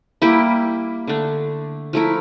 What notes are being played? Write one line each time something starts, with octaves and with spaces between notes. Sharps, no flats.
G3 A#3 E4 G4
D3 A3 D4
F3 A3 E4 A#4